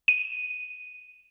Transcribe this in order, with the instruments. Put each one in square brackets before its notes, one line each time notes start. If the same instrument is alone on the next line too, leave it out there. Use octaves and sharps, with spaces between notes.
[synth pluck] D#7